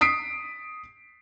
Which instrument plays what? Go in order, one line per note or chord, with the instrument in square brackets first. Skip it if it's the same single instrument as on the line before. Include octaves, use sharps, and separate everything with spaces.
[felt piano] D#6 B6 C7 D7